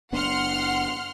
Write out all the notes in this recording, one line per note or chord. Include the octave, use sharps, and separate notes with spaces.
F#1 B3 D4 F#5 C6 F6